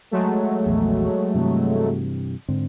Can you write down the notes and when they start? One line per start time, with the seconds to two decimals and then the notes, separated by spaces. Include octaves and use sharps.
0.11 F#3 G#3 A3
0.66 A#1 E2
1.35 G2 C3 E3
2.49 G#2 D3 C4